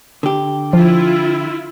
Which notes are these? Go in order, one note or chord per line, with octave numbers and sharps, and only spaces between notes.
D3 G4
F3 E4 F4